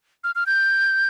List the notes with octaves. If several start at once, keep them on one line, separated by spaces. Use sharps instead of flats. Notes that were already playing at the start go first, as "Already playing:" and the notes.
F6
F6
G6